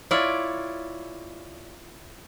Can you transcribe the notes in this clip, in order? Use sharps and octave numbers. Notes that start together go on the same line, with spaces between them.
E4 F4 C#5 D5